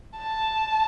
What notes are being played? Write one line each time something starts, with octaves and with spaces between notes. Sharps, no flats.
A5